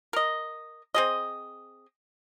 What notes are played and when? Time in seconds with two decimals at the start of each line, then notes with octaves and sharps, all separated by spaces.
0.13 A#4 D#5
0.94 C4 G#4 D#5